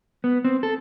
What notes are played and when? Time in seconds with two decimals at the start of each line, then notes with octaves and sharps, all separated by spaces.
0.24 B3
0.45 C4
0.63 A4